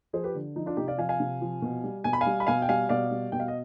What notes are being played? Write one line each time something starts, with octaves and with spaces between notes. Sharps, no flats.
F3 G#4 C5
G4 B4
D3
F3 D#4
D4 F4
C3 D#4 G4
D5 F5
F3 F5 G#5
F5 G#5
C3
F3
B2
G3
B2 G#5
B5
F5 G#5
G3
B5
B2 F5 G#5
G5
G3 F5 G#5
B2 D5 F5
G3
B2 G5
F5
D#5